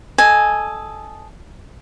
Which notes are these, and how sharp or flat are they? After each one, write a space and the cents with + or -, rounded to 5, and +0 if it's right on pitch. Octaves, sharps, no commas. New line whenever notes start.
A4 -15 D#5 +0 G#5 +0